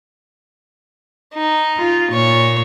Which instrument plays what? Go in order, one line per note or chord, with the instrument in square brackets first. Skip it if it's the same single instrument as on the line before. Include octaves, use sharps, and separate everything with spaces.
[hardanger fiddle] D#4
[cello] F4
[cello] A#2 [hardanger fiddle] C#5